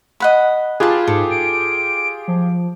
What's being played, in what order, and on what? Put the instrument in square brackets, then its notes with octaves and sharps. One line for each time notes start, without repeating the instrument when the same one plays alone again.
[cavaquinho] D#5 F#5 B5
[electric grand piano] F4 G4 G#4 [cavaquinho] B4 A5
[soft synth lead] G#2 [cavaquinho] A4
[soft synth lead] D7
F3